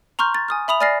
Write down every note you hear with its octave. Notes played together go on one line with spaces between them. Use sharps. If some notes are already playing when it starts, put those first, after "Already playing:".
A#5 C6 C#6 F6 G6
A6
G#5 D#6 F6
E5 B5 D#6 F7
D5 G#5 F6 A6 A#6 C7